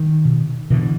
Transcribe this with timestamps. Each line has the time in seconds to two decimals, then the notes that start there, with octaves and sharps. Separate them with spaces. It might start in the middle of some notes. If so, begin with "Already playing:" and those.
Already playing: D#3
0.25 B2
0.70 B2 D3 E3